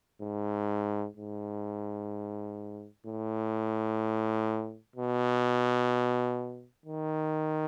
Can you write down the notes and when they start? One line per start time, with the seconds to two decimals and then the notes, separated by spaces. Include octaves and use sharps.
0.22 G#2
1.17 G#2
3.07 A2
4.96 B2
6.86 D#3